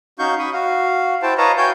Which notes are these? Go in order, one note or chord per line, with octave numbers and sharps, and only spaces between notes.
C#4 D#4 F#4 F5 C#6 G6
B5 C#6 D#6
F#4 F5
E4 F#4 C5 G5 A5
B4 C#5 D#5 F5 A5 A#5
F#4 C#5 F5 G5 G#5 G6